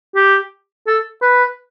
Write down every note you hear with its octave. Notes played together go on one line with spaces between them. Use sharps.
G4
A4
B4